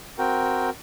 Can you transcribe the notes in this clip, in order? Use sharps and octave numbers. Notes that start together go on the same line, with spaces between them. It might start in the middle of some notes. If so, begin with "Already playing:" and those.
C4 F#4 A#4 G5